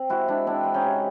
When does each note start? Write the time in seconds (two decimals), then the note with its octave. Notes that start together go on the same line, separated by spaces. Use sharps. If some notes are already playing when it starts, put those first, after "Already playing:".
Already playing: C4
0.10 G#3 E4 F#4
0.28 G#3 D4 E4
0.47 C4 D4 E4
0.64 C4
0.74 C#4 D#4
0.84 C3